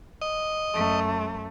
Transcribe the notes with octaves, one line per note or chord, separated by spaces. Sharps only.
D#5
F#2 A3